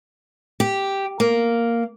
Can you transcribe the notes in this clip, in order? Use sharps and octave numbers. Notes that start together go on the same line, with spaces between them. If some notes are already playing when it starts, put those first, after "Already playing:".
G4
A#3